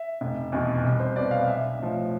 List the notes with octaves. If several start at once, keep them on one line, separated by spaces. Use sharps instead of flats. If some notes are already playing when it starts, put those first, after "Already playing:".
Already playing: E5
F1
E2 B2
C2
C5
B2 B3 D5
F5
B1 E5
A2 F3